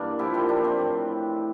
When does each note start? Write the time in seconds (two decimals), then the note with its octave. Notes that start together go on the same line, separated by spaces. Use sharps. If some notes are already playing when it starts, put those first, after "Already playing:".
Already playing: G2 E3 A#3 D4
0.19 A#2 F3 E4 G4
0.34 E4 G4
0.49 A#3 D4
0.64 C4
0.79 A2 E3